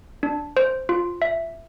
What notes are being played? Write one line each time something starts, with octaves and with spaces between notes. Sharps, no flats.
D4
C5
F4
E5